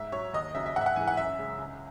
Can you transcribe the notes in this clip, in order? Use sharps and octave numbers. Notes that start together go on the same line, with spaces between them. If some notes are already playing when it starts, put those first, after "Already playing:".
Already playing: G#2 E5
F#3 C#5
D#2 D#5
C#3 F#3 E5
E5
G#2 F#5
E5
F#5
E3 G#3 G#5
F#5
F#2 E5
C#3 G#3
C#2